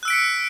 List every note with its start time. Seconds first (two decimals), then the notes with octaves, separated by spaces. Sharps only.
0.03 F#6
0.05 E6
0.08 D7
0.10 B6
0.13 C#7